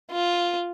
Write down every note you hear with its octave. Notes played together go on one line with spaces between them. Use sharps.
F4